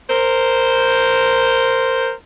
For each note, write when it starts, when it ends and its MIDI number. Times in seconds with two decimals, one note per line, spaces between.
0.10 2.12 70
0.10 2.12 72